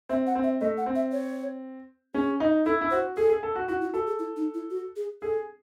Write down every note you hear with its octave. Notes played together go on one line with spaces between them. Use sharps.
C4 E5
F#5
C4
E5
A3 D#5
F#5
C4
E5
C#5
C#4 G#4
D#4
E4 A4
E4
F#4 C5
G#4 A4
G#4
A4
F#4
E4 F#4
E4
F#4 A4
G#4
E4
D#4
E4
F#4
G#4
G#4 A4